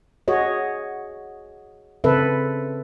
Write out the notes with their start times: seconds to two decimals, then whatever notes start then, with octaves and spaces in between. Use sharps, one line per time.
0.28 F#4 G#4 C#5 D#5
2.04 C#3 C4 A4 B4 E5